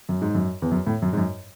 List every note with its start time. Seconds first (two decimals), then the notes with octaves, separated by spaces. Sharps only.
0.09 F#2
0.22 G#2
0.35 F#2
0.62 E2
0.71 F#2
0.87 A2
1.02 F#2
1.13 G#2
1.17 F#2